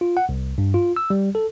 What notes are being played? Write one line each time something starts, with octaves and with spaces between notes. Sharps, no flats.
F4
F#5
C2
G2
F4
E6
G3
A4